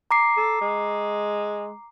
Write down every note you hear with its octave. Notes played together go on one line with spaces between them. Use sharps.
A#5 D6 C7
A4
G#3